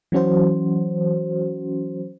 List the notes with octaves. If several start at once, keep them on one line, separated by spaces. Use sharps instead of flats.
E3 F#3 C#4 F#4 C5